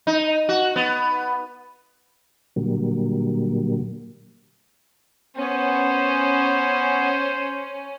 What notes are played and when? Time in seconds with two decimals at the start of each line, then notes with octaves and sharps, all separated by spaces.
0.07 D#4
0.49 F#4
0.76 B3
2.56 A#2 D3 F#3 G3 A#3
5.38 B3 C#4 C5